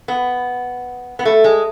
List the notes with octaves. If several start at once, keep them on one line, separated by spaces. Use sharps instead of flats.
B3
B3
A3
G#3